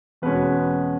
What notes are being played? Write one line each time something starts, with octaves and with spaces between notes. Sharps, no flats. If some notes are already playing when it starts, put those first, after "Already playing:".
E2 B2 G#3 C#4 B4